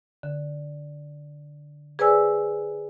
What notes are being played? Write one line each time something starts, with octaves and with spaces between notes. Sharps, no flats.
D3
G#4 B4 C5 D5 G#5 E6